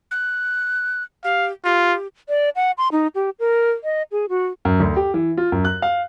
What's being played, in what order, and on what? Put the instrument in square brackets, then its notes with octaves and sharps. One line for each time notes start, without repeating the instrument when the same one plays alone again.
[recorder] F#6
[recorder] G4 [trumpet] F5
[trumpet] F4 [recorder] G4
[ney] D5
F#5
C6
D#4
G4
A#4
D#5
G#4
F#4
[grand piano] F#2
D2
G4
E3
F4
F#2
F#6
F5